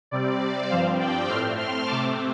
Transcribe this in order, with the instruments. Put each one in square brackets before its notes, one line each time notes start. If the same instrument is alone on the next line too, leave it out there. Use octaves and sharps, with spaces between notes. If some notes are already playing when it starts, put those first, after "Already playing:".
[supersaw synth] C3 G3 C4 D5
G2 F3 C4 C5 F5
D5 G5
A2 A3 C4 C6 F6
C6 F6
C3 A3 C4 A5 D6